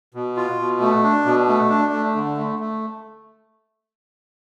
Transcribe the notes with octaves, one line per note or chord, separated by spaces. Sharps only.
B2
F4
B2
A3
D4
B2
A3
D4
A3
D3
A3
A3